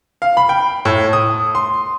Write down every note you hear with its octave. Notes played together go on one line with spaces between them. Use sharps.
F5
B5
G5
A2
D#6
C6